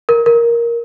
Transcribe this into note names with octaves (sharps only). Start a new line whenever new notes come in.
A#4
A#4